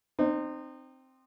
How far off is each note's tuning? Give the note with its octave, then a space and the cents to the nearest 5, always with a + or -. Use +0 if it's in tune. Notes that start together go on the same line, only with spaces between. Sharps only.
C4 +0 D#4 -30